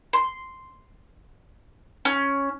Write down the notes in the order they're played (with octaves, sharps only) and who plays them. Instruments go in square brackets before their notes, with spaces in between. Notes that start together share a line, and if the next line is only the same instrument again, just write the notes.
[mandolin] C6
C#4